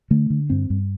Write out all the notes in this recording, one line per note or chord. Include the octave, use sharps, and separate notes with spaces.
D3 A3
D3
G2 C4
G2